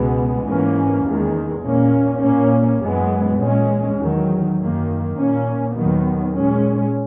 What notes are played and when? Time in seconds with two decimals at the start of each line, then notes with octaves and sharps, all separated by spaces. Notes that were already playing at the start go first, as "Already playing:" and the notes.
Already playing: C#2 B2 G#3 B3
0.45 G#2 E3 A#3 C#4
1.05 E2 D#3 G#3
1.64 A#2 A#3 C#4
2.22 A#2 A#3 C#4
2.81 F#2 E3 G#3 B3
3.40 A#2 G#3 C#4
3.98 E2 D#3 F#3
4.58 F#2 D#3 A#3
5.17 A#2 A#3 C#4
5.75 D#2 D#3 F#3 B3
6.34 A#2 G#3 C#4